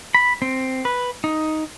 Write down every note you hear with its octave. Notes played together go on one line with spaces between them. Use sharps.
B5
C4
B4
D#4